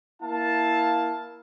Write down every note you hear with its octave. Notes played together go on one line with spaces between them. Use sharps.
A#3 E4 F5 A5